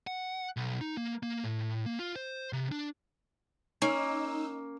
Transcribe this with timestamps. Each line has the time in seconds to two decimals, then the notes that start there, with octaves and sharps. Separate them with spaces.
0.07 F#5
0.57 B1
0.81 D#4
0.97 A#3
1.23 A#3
1.43 A2
1.86 A#3
1.99 F4
2.16 C5
2.53 C3
2.72 D4
3.82 A#3 C#4 D#4 E6